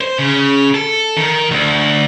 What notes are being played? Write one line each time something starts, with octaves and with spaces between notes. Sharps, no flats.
C5
C#3
A4
D#3
D2